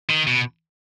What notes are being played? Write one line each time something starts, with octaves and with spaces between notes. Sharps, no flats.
D#3
B2